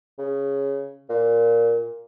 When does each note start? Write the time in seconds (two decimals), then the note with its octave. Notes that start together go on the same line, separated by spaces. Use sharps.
0.18 C#3
1.09 A#2